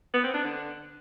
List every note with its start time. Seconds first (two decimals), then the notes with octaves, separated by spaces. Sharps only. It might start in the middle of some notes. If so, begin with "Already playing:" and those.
0.13 B3
0.23 C4
0.34 D4
0.44 D3